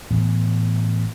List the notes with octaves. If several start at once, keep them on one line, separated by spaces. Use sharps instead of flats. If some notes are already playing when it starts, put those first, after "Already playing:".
A2 E3 B3